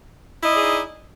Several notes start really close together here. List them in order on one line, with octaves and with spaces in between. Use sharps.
E4 D#5 D5 G#4 D#4